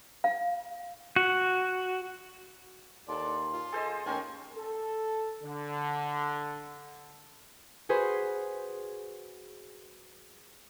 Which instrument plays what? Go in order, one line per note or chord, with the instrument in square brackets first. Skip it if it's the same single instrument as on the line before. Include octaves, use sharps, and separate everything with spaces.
[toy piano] F5
[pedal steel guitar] F#4
[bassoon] D#2 [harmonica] A4 D5 [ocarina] C6
[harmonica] F4
[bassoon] G#4 [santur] A4 C5 D#5
[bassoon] D#2 [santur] C#4 A#4 [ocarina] G5 [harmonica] G#5 C6
[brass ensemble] A4
D3
[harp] F#4 G#4 B4 C5